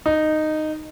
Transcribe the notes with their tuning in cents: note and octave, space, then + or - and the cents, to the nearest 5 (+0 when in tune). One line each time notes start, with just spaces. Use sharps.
D#4 -10